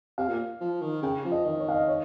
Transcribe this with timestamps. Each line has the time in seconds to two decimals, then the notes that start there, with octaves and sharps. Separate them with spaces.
0.18 C3 F5
0.28 A#2
0.60 F3
0.82 D#3
1.02 C#3 G5
1.25 F3
1.32 D#5
1.45 D#3 D#5
1.59 C#5
1.69 F5
1.74 D#5
1.88 C#5